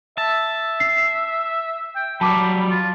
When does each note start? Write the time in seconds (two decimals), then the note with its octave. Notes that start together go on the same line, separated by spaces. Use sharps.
0.18 E5 A5
0.80 C7
1.96 G5
2.21 F#3 G3 A5 B5 D6
2.71 F4